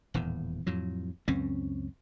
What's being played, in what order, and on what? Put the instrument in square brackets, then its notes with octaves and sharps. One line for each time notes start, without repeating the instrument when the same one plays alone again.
[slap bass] D#1 E2 A2
F2 A2 F#3
C#2 F#2 C4 C#4